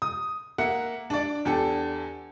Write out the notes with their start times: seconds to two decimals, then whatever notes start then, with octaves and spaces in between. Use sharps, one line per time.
0.02 D#6
0.58 A#3 E5 F#5
1.10 D4 D5
1.45 E2 D4 G4 A4